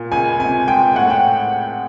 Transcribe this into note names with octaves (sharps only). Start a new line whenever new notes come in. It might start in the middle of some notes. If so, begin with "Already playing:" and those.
Already playing: A#2
C#2 G#5
C3 G#5
G#3 G5
A2 F#5
G5